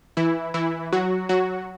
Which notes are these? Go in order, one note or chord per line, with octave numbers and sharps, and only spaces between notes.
E3 E4
E3 E4
F#3 F#4
F#3 F#4